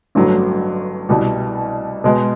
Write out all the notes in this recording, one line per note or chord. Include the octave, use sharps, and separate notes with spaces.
A1 G2 D3 F#3
C2 B2 G3
B2 G#3 B3